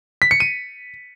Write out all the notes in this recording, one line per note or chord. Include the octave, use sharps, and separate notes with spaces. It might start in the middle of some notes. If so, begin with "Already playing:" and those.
B6
C#7
D#7